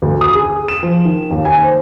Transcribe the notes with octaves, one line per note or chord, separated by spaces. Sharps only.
D2
D#6
G#4
E7
F3
D#3
D#2
G#5
C5